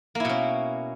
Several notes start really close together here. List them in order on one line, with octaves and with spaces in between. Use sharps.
A#3 E4 B2 C#4